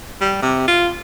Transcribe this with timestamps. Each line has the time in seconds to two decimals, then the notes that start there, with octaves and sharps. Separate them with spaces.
0.21 G3
0.42 C3
0.68 F4